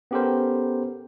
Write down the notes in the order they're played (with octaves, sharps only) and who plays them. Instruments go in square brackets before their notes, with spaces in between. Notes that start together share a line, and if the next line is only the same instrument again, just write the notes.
[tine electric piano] B3 C#4 G4 A4 A#4 C5